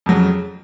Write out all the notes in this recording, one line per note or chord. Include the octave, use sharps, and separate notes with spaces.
F2 C#3 F#3